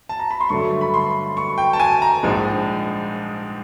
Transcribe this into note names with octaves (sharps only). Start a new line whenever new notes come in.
A5
A#5
B5
C6
G2 D3 F#3 A3 C#6
B5
C6
C#6
G5
A5
G#5
A#5
A#1 G#2 F3 G#3